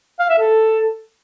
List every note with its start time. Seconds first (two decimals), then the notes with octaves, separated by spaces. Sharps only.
0.19 F5
0.29 E5
0.39 A4